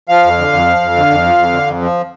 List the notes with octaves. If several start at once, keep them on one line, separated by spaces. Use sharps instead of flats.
F3 F5
F2
D3
F2
F3
F2
D3
F2
F3
F2
D3
F2
F3